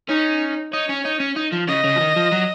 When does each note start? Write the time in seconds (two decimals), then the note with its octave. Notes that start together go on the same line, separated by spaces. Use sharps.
0.08 C#4 D#4
0.73 D#4 C#5
0.89 C#4
1.05 D#4
1.20 C#4
1.37 D#4
1.53 F3
1.68 C#3 D#5
1.84 C#3
1.96 F3
2.00 D#3
2.16 F3
2.32 F#3